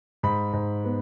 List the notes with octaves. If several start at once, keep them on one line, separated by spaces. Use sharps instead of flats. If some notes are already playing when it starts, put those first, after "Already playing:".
G#2 B5
G#2
B3